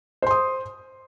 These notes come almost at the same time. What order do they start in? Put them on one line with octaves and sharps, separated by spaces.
C5 C6 D#6